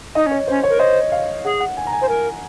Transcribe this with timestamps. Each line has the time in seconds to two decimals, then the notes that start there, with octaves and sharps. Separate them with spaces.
0.15 D#4 D#5
0.26 C#4 C#5
0.48 C#4 C5
0.63 C#5
0.70 A#4
0.79 C5 D#5
1.12 F5
1.44 G#4 F#5
1.60 F#5
1.77 G#5
1.87 A#5
1.93 G#5
2.01 C5
2.08 A#4 G#5